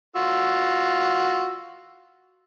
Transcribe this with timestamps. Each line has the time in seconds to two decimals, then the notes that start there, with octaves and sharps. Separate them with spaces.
0.16 F4 F#4 E6